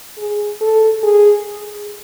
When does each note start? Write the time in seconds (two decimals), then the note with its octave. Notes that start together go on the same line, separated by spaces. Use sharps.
0.18 G#4
0.61 A4
1.03 G#4